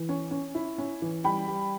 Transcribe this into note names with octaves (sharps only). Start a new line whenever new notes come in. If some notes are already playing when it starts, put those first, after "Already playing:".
Already playing: E3
C#4
C#4
E4
C#4
E3
G3 G5 B5
G3